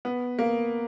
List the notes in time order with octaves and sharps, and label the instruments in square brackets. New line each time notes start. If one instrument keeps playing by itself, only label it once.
[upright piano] B3
A#3